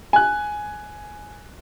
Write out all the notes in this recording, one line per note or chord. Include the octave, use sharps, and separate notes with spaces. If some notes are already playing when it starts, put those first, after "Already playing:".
G#5 F#6